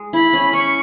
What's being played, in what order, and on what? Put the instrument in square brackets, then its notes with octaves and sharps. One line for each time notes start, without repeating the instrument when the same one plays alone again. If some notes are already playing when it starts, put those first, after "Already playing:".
Already playing: [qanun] G#3
[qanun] E4 [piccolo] B5
[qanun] C#4
[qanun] C#4 [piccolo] C#6